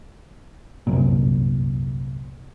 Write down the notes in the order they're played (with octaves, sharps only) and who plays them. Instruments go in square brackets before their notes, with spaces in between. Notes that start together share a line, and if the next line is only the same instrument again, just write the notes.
[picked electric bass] G1 C2 F#2 A#2